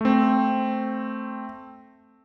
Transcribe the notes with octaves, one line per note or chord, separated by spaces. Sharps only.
A3 C4